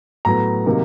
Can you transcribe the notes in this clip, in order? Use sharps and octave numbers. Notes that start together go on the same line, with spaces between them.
A2 F#3 B3 A#5
C3 D#3 F#3 A#3